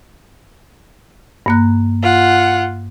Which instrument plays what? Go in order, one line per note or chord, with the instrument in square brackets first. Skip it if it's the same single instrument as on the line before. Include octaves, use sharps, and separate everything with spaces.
[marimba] G2 A#3 F#6
[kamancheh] F4 F#5